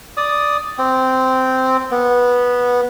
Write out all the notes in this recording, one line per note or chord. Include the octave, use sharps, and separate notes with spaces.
D5 D#6
C4
B3